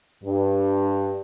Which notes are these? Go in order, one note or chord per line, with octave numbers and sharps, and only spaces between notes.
G2